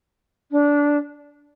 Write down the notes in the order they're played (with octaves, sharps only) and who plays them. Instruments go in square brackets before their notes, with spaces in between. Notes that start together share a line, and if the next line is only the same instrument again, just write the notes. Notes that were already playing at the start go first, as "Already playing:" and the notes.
[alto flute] D4